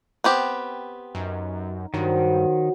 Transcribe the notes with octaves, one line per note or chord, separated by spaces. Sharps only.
B3 C4 G4
F#2 D#4
G2 D#3 F#3 C5